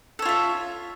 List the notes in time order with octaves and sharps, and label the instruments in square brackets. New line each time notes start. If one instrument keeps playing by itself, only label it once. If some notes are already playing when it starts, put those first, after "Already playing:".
[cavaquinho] A4
C#5
F4
E5